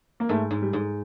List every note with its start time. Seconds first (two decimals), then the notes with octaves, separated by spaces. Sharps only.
0.20 A#3
0.29 G#2 A3
0.51 G#2
0.62 G3
0.73 G#2